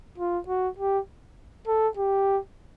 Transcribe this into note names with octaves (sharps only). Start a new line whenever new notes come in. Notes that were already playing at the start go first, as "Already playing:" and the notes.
F4
F#4
G4
A4
G4